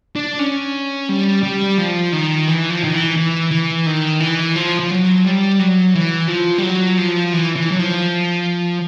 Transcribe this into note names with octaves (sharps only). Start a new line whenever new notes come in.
D4
C#4
G3
G3
F3
D#3
E3
F3
D#3
E3
E3
E3
D#3
E3
F3
F3
F#3
G3
F#3
E3
F3
G3
F#3
F3
E3
E3
F#3
F3